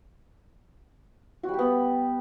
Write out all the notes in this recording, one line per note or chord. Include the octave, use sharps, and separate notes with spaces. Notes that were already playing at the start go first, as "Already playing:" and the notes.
F#4
G3
G4
B3